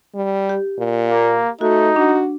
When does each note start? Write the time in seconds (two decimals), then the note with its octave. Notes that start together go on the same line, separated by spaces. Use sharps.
0.15 G3
0.49 G4
0.78 A#2
1.08 A#3
1.61 A3 D#4 F#4
1.96 D4 F#4